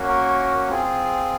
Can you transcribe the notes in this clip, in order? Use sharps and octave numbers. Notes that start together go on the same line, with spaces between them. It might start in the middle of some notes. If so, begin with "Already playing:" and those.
Already playing: A#3 C#4 F#4
A#4
C4 F4 G#4